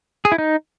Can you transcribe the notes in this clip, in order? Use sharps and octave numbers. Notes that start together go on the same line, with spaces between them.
G#4
E4
D#4